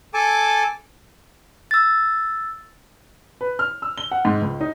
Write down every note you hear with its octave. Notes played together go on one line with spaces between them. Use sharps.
A4 G#5 A5 D6
E6 A6
B4
F6
E6
G7
F#5
G#2
C#2
D#4